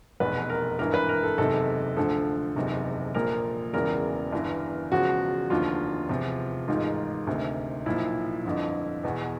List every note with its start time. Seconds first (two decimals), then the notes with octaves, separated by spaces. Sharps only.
0.20 F1 E2 B2 B4
0.49 A#4
0.79 G#1 G2 E3 A#4
0.94 B4
1.09 A#4
1.23 A4
1.38 F#1 E2 C3 D#3 A4
1.96 D2 D3 F3 A4
2.56 F#1 E2 C3 D#3
3.15 A#1 A#2 F3 A#4
3.73 E1 E2 C#3 E3 A#4
4.33 G1 G2 E3
4.91 E1 E2 C#3 F3 F#4
5.50 F1 D#2 D3 F3 F4
6.09 E2 C3 F3
6.68 A1 G#2 D#3 F4
7.27 D2 C3 D#3
7.86 B1 A#2 F3 E4
8.45 G1 F2 D3 F3
9.04 E2 B2